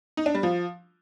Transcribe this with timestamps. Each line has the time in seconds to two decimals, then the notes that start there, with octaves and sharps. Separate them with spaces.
0.17 D#4
0.26 D4
0.35 G3
0.43 F3